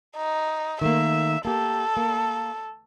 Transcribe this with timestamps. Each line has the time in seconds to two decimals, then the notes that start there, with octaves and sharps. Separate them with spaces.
0.16 D#4
0.81 D#3 A3 A#3 E5
1.45 A#3 G4 A4
1.97 A#3